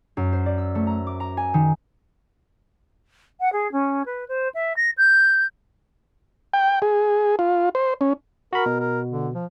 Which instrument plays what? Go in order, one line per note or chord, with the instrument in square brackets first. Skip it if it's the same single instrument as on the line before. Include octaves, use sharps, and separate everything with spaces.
[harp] F#2
C5
D5
E6
A3
A#5
D6
A#5
G#5
D#3
[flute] F#5
G#4
C#4
B4
C5
E5
A#6
G6
[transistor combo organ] G5
G#4
F4
C5
C#4
[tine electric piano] F#4 B5 [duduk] A#4
[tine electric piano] B2
[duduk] A#4
D3
F3